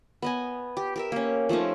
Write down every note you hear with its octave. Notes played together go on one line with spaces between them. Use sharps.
B3 D#5 G#5
G4
G4 A#4 E5
A#3 C#4
F3 A3 C#4 D#4